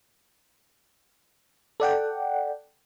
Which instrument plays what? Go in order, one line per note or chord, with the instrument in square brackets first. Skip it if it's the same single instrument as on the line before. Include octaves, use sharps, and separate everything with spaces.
[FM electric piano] A4 D5 F#5 G5